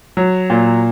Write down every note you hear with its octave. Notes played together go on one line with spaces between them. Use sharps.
F#3
A#2